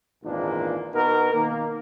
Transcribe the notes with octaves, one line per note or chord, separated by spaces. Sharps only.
G#1 E2 A#2 A#3 D4
B2 B3 D#4 A#4
D#3 A#3